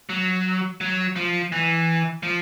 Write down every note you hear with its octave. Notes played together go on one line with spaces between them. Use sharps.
F#3
F#3
F3
E3
F3